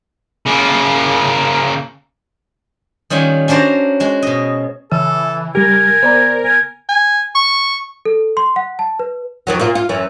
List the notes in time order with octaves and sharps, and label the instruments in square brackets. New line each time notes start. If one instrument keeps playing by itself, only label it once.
[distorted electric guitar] C#3 A#3
[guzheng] D#3 G3 C#4 F4 G#5
C#4 D4 F#4 C5 A5 A#5
G#3 F#4
B2 D#5
[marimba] C#3 [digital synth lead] E3 [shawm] A4
[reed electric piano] G3 G4 [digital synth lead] A#4 [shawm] G#5
[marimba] B3 [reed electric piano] C5 D5 A#5
[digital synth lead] A#4 [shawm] G#5
[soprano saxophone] G#5
C#6
[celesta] A4
C6
F#5
A5
B4
[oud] F2 D#3 F#3
A#2 A#3 F4
F4
F#2 E3 C#4